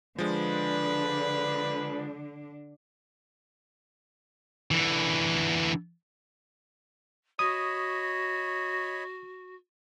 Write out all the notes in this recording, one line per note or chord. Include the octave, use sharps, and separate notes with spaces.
D3 F3 G#3 D4 B4
D3 E3
F#4 C#5 D#5 B5 D#6